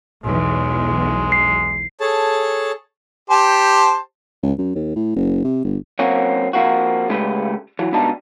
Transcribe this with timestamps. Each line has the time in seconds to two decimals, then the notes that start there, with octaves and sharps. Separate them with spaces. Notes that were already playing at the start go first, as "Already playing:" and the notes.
0.24 B1 E2 G#3
1.32 C7
2.00 G#4 A4 C#5 A5
3.30 G4 C5 A5
4.43 C#2
4.58 F#2
4.75 D#2
4.96 A2
5.16 F#1
5.44 C3
5.64 G1
5.99 F#3 A#3 C4 C#4 F#4
6.53 F3 A#3 C4 F#4
7.09 C#3 G#3 A3 G4 B4
7.79 E3 F#3
7.92 C#2 G2 B2 G3 D#4 A5